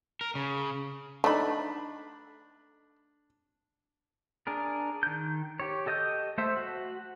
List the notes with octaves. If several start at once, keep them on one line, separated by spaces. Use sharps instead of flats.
A#4
C#3
A3 D4 D#4 B5
D4 G#4 A#4
D#3 G6
G4 C#5
G4 A4 D#5 D#6 G6
A3 C5 E5
F#4